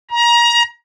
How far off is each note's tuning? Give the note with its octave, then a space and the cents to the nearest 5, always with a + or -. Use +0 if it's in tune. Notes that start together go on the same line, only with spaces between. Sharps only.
A#5 +25